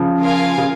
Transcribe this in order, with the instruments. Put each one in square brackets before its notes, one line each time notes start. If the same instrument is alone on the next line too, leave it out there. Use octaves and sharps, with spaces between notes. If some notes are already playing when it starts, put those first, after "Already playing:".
Already playing: [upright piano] C#3 F3
[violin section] F4 A#4 F5 G#5
[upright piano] C#3